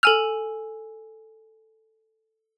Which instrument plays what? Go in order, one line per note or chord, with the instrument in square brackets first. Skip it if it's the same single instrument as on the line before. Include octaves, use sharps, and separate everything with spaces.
[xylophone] A4 G#5 F7 [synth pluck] E6 F6